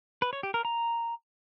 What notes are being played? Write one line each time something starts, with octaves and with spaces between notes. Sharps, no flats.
B4
C#5
G4
A#4
A#5